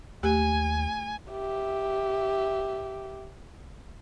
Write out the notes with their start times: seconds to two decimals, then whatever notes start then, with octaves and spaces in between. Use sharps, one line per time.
0.23 D#2 A3 G4 G#5
1.31 G4 E5